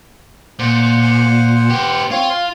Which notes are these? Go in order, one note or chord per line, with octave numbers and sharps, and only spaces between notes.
A#2 C5 F#5
B3 G4
C4 F4 C#5 C6
F5